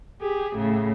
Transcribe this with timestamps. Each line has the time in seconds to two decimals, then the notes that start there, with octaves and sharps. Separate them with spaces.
0.20 G4 G#4
0.56 A2 C#3